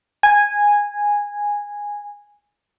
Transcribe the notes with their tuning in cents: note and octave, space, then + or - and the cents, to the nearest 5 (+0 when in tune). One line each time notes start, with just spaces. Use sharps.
G#5 -10